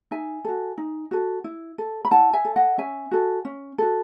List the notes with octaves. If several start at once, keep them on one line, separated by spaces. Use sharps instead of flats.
D#4 E5 G#5
F#4 A4
D#4
F#4 A4
E4
A4
B5
E4 F#5 A5
E5 G#5
A4
D#5 F#5
C#4 E5 G#5
F#4 A4
C#4
F#4 A4